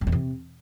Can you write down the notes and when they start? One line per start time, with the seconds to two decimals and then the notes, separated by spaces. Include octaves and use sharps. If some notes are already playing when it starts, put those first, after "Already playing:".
0.01 F#2
0.07 E2
0.12 C3